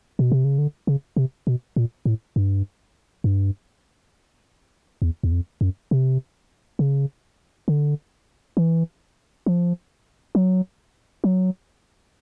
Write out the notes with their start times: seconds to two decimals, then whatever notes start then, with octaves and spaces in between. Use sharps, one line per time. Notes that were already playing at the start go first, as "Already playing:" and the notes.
0.19 B2
0.32 C3
0.44 C#3
0.58 D3
0.87 C#3
1.16 C3
1.47 B2
1.76 A#2
2.05 A2
2.36 G2
3.24 G2
5.02 E2
5.23 E2
5.32 F2
5.61 F#2
5.91 C3
6.79 C#3
7.68 D3
8.57 E3
9.46 F3
10.35 F#3
11.24 F#3